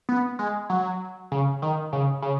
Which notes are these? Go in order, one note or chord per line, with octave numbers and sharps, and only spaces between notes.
B3
G#3
F#3
C#3
D#3
C#3
C#3